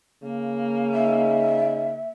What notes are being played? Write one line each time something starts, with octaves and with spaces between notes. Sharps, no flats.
C#3 A#3
D#4 E5